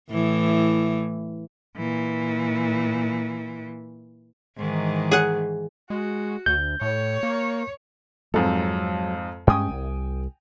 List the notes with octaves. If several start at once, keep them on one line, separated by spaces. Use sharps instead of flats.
A2 E3
A#2 E3
G#2 D#3 E3
G#4 F#5
G#3 F#4
D2 G6
A2 C#5
A#3
F2 G#2 F#3 A4
G2 G#3 C#4 G5 G#5 D#6
C2